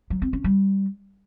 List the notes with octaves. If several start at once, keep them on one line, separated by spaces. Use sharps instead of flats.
F#3
C4
C#4
G3